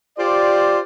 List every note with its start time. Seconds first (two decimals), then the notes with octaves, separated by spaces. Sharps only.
0.18 F4 G4 C5 D5